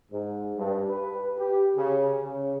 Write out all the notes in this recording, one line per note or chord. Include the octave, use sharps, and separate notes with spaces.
G#2
G2
B4
G4
C#3
C#3